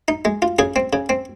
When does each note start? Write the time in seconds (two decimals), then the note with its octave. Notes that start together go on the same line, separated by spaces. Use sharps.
0.08 D#4
0.25 G#3
0.42 F4
0.59 C#3 G#4
0.76 C4
0.93 C#3
1.09 C4